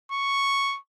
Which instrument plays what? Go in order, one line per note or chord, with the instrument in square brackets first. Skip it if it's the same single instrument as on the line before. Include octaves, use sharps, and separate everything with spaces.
[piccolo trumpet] C#6